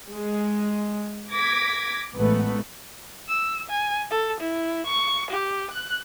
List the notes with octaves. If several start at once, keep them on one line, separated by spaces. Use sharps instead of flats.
G#3
D6 G#6 A#6 B6
A1 G#2 A3 B3 B4
E6
G#5
A4
E4
C#6
G4
F#6